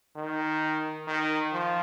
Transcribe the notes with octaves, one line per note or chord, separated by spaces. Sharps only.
D#3
D#3
F3